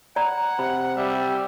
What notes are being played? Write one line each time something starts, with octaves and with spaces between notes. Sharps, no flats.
D5 F#5 A#5 B5
C3 B5
G3 E5